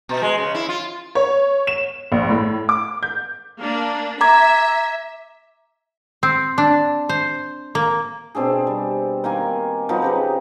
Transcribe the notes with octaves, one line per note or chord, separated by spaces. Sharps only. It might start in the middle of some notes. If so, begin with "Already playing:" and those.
B2
G#3
C#3
E4
F4
C#5
E7
A#1
A2
D6
G6
A#3 D4
E5 A#5 D6 G#6
C4
D4
C5
A#3
B2 C4 D4 G#4
G3
D#3 A#3 G#5
F3 F#3 B3 D#4
C#3 G4 B4